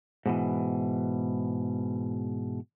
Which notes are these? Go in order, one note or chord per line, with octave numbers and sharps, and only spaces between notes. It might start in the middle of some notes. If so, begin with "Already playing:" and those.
G#2 B2 E3